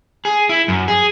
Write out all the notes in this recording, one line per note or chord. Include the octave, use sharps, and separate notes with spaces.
G#4
E4
F#2
G#4